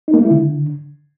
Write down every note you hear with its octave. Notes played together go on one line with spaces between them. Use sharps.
D#4
A#3
G#3
E4
D3